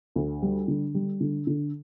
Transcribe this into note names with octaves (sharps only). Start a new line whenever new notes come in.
D2
G3
D3
G3
D3
D3